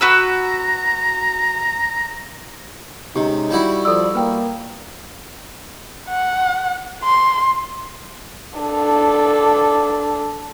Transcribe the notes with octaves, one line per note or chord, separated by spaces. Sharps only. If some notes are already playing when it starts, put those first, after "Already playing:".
F#4 B4 A#5 E6
C3 G#3 C#4 D#4 G4
G3 E4 F#4
F3 A4 D5 E6
A#3 B4 G5
F#5
C6
D4 A4